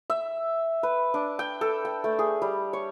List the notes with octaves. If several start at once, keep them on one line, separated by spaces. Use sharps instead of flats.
E5
B4
D4
G5
A4
G5
A3
G#4
G3
C#5